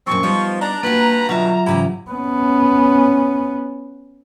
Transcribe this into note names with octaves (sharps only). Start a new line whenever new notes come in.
F#2 A#2 F3 G#3 C4 C#6
F3 G3 B3 D#4
D4 A#5
G2 A#3 F4 F#4 B4
G2 B2 D3 F#3 D4 F4 E5
G#2 C#3 E3 E4 G4
B3 C#4